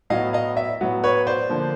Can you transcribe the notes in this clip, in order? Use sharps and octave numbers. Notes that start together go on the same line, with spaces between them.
A2 F#3 B3 D#5 F5
D#5 F5
D5 E5
A2 F#3 B3
B4 C#5
C5 D5
D3 F3 A#3